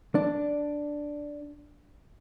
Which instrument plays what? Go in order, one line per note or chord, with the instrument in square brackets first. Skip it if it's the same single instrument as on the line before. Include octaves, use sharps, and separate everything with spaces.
[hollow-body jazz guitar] D4